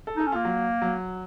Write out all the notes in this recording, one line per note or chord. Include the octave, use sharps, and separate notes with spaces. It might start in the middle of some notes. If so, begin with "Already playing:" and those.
A4
D#4
A4
C#4
A#3 F4
F#3
F#3